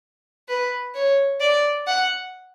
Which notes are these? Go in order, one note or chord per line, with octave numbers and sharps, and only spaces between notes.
B4
C#5
D5
F#5